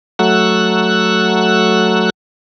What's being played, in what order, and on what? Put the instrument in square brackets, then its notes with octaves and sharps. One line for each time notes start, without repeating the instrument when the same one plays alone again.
[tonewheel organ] F#3 A3 F#5 E6 F#6